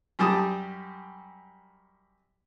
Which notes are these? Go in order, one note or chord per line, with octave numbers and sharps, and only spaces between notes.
F#2 G3 G4 A5 D#6